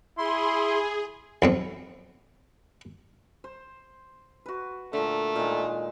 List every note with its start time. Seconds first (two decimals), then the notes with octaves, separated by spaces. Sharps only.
0.18 E4 G#4 B5 C6
1.42 B1 F2 C4
3.44 C5
4.46 F#4 B4
4.93 A#2 D3 A3
5.36 A#2 D#3 G#3